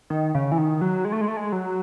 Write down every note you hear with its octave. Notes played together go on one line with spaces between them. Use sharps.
D#3
C#3
E3
D#3
F#3
G#3
A3
G#3
A3
G#3
F#3